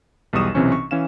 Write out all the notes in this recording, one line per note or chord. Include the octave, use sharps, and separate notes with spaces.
B1 E2 G3 C#6 D#6 E7
B1 C3 E3 C4 C#4 C#6
C#6
E3 C#4 F5 E7